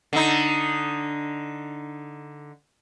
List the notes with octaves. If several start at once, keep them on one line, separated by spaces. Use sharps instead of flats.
D3 D#4